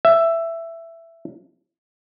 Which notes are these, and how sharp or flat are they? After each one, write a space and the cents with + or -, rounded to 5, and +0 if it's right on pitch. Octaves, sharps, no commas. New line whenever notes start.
E5 +10